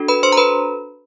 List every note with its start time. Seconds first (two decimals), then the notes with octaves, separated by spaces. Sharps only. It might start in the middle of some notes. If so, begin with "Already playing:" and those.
Already playing: D4 F#4 A4
0.08 B4 B5
0.23 C5 C6
0.32 A#5
0.37 B4 B5